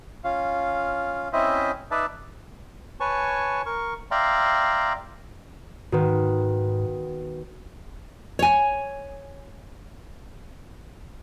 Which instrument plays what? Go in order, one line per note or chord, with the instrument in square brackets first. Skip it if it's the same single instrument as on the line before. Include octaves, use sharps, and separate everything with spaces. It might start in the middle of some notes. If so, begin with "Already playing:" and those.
[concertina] C#4 F4 F5
C4 C#4 E4 C5 D#5 E5
D#4 B4 D5 E5 A5
B4 C#5 G#5 A5 C#6
A#4 C#6
D5 E5 F5 G5 A#5 C6
[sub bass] G#2 [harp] D#3 B3 [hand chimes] F#4 B4
[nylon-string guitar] C#5 G#5